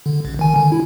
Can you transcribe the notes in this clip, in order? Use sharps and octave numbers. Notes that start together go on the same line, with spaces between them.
D3
A1
D#3 G#5
D3
E4